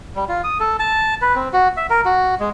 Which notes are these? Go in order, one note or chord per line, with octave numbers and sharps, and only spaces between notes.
G3
F4
D#6
A4
A5
B4
C4
F#4
E5
A#4
F#4
G#3